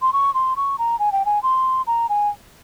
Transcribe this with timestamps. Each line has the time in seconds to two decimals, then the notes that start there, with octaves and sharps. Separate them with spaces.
0.02 C6
0.13 C#6
0.34 C6
0.56 C#6
0.79 A#5
0.99 G#5
1.12 G5
1.26 G#5
1.43 C6
1.87 A#5
2.09 G#5